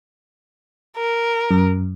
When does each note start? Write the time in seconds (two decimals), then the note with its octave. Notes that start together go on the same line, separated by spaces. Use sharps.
0.97 A#4
1.51 F#2